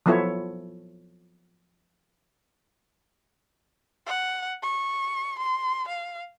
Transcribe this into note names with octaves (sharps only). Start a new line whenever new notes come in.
F3 F#3 B3 E4 A4 C#5
F#5
C#6
C6
F5